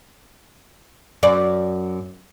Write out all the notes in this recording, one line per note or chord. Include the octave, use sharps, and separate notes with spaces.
F#2 D5